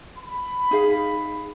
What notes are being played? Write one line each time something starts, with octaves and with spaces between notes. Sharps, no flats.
B5
D#4 G#4 F5